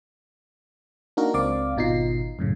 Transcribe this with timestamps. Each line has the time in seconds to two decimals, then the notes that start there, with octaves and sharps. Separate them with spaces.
1.17 A#3 D4 D#4 F#4 A#4
1.34 C#2 C4 D5 F5 D6
1.77 G#1 B2 D#4 F4 C7
2.39 F#2 A2 C#3